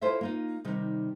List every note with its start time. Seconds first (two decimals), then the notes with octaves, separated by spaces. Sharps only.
0.01 E4 F4 A4 C5 C#5 E5
0.21 A#3 D#4 F4
0.65 C3 D#3 G3 D#4